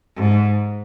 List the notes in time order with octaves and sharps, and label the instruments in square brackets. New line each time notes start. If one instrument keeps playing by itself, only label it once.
[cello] G#2